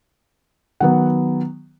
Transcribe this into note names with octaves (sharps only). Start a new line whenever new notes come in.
D#3 F#3 B3 F#5